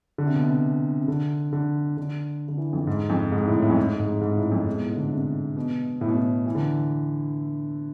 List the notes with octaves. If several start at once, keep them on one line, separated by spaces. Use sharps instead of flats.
D3
C3
B2
C3
C3
D3
D3
D3
D3
E3
F2
G#2
F2
G#2
A2
A2
F2
G#2
G#2
G#2
A2
F2
G#2
B2
A2
D3
C3
B2
A2
B2
A2
E3
D3